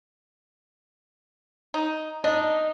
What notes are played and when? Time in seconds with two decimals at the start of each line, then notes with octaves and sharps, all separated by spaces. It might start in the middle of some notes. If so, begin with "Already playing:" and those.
1.74 D#4
2.24 D4 D#4 D#5